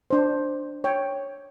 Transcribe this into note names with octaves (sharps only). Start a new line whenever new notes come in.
D4 C5
C#5 G5